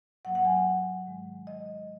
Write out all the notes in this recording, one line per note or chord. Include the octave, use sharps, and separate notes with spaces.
G#2 F#3 A#3 F#5
F#5
G#5
F#5
G#2 D#3 G#3
D#5